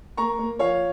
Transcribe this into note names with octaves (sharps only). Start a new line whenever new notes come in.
A#3 A#5 C#6
A#3
F3 C#5 F5